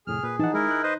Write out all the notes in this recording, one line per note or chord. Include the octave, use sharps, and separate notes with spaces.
F2 A2 C3 G#4 F6
A#2 B4
E3 F3 D#4 F#5 A5
G#3 E4 A#4
F#6
B4 C5 D#5